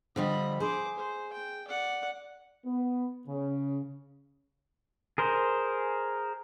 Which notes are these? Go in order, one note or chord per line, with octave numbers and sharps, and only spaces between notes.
D3 F3 G3 D#5 B5
G#4 C5 D6
C5
G5
D5 F#5
B3
C#3
G#4 A#4 C5